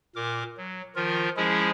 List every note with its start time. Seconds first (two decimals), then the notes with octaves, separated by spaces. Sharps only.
0.16 A#2 A#4 D6
0.57 F#3
0.96 D#3 F3 F4 A#4
1.37 F3 G#3 C#4 E4 G#4